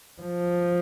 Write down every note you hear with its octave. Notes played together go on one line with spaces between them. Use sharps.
F3